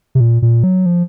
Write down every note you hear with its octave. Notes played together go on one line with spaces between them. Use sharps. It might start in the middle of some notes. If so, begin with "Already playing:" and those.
C3
A#2
A#2
F#3
F3